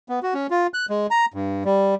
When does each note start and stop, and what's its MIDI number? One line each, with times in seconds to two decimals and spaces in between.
0.09 0.20 59
0.23 0.34 66
0.34 0.47 61
0.50 0.67 65
0.74 0.86 90
0.90 1.07 56
1.11 1.26 82
1.34 1.63 43
1.65 1.95 55